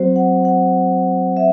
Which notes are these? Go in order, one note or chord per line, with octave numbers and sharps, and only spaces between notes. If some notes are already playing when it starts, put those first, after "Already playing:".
Already playing: F#3 C4 F#4 C5
F#5
F#5
E5